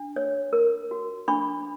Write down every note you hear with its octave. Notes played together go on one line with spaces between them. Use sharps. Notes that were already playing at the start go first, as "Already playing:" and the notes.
Already playing: D4
C#5
A#4
F#4
D4 B5 C#6